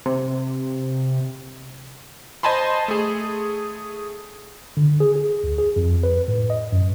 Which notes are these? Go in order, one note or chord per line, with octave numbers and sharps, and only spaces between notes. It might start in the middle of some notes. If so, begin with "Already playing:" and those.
C3
C5 D#5 G#5 A5 B5 C6
A3 G#4
D3
G#4
G#4
D2
G#4
F2
B4
A2
D#5
F#2